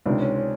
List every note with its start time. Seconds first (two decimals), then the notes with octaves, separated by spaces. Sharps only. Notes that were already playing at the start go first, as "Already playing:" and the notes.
0.06 C#2 C3 D#3 D4
0.21 C#4
0.36 C#4